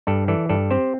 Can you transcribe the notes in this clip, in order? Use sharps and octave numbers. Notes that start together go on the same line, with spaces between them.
G2 A4 D5
E3 A4 D5
G2 A4 D5
C4 G4 C5